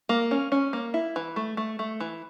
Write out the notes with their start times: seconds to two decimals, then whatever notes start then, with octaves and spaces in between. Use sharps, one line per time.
0.09 A#3
0.31 C#4
0.52 C#4
0.73 A#3
0.94 E4
1.16 E3
1.36 A3
1.57 A3
1.79 A3
2.00 E3